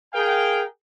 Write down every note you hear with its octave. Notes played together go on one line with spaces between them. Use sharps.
G#4 A#4 F5 G5